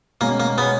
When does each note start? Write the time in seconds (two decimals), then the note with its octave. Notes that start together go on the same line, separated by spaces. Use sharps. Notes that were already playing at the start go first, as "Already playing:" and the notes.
0.21 B2 G#3 A#3 C#4
0.40 A#3
0.58 B2 G#3 B3 C#4